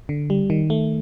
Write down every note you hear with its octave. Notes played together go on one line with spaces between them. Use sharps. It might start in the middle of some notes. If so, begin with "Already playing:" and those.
D3
G3
D#3
A3